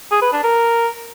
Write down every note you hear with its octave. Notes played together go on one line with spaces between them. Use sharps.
G#4
B4
D4
A#4